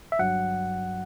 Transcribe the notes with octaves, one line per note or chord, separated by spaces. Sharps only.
E5
G1 G2 F#3 F#5